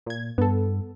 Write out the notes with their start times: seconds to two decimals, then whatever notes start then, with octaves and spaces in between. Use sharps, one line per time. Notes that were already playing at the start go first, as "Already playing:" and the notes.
0.06 A#2 G#6
0.38 G2 B3 A4